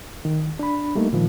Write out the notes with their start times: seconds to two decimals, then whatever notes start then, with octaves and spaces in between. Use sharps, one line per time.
0.25 D#3
0.59 D4 B5
0.95 G3 A3 A#3 D#4
1.13 A#2 D#3 F3